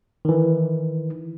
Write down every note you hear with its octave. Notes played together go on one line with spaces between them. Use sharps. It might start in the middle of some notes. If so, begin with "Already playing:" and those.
D#3 E3